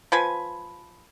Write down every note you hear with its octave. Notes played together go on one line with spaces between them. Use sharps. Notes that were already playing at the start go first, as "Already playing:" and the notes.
F3 B4 G#5